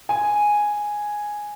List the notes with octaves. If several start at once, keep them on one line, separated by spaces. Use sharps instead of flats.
G#5